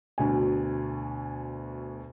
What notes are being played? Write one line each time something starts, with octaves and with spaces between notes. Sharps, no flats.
D2 B2 G#5